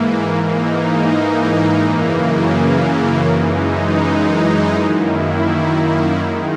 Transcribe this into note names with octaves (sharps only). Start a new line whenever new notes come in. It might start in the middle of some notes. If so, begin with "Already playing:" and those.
Already playing: G#2 E3 A#3
G#2 E3 A#3 D#4
F#2 C#3 E3 A#3
F#2 E3 G#3 D#4
F#2 D#3 A#3 E4
D#3 G#3 D#4